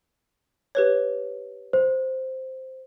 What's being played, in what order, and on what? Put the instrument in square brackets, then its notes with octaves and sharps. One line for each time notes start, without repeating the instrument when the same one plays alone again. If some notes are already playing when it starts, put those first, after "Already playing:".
[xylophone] G4 B4 C#5
[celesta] C5